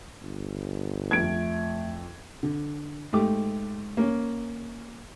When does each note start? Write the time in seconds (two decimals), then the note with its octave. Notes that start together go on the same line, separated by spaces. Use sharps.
0.23 G1
1.11 F2 A3 G#6 D7
2.43 D3
3.13 G#2 A3 G4 D6
3.97 A#3 C#4